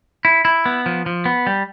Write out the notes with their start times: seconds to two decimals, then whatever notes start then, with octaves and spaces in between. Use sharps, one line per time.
0.25 E4
0.45 E4
0.66 B3
0.86 F3
1.06 F3
1.25 B3
1.47 G3